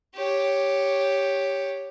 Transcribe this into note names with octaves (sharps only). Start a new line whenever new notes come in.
G4 C#5